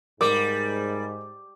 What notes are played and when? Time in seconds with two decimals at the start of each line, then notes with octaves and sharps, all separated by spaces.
0.21 G#2 G3 A#4 D6